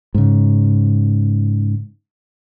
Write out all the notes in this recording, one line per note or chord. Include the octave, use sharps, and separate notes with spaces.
G#2 C#3